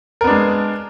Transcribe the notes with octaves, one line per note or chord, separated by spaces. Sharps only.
G#3 B3 D4 A#4